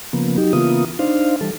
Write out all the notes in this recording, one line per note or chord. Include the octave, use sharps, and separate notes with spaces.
C#3 F3 A#3 B3
F#3 D#4 G4
C#3 E3 A#3 B3 F4 D#6
D4 D#4 C5 F5
E3 G3 A4